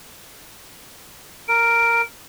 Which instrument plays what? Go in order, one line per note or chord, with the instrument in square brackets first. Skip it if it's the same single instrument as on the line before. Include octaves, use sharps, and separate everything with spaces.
[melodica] A#4 [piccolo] D7